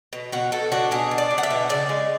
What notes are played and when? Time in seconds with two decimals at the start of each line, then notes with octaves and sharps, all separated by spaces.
0.13 B2
0.32 B2 F#4
0.52 B2 A4
0.72 D4 F#4
0.91 B2 G#4
1.11 D4
1.18 D5
1.31 D4
1.38 F#5
1.43 E5
1.50 B2
1.69 C#3 D5
1.89 G#3